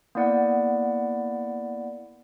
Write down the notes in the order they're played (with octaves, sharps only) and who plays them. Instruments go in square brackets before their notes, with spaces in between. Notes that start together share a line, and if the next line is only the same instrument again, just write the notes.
[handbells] A#3 B3 E4 D5 F#5